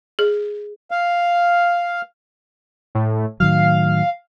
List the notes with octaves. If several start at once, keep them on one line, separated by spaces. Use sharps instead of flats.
G#4
F5
A2
A2 D#3 F#3 F5